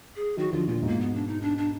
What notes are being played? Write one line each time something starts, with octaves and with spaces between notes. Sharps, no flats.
G#4
D#3 F#3 F#4
D3 F3 F4
A#2 D3 F4
G#2 B2 A#3
B3
D4
D#4
D4
D4